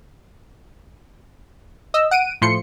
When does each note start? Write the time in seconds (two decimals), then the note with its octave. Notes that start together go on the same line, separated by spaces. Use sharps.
1.94 D#5 E6
2.11 F#5 D7 D#7
2.42 A2 F3 C6 C#7